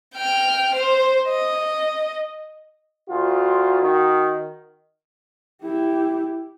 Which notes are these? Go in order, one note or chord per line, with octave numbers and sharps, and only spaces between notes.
G5 F6
C5
D#5
D2 F4 F#4
D#3
E4 G4